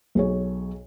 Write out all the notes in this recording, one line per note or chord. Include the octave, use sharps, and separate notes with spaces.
B1 G#4 C#5